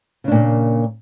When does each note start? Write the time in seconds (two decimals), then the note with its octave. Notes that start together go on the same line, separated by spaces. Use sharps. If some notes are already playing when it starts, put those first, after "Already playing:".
0.24 C#3
0.28 D4
0.31 A#2
0.35 A#3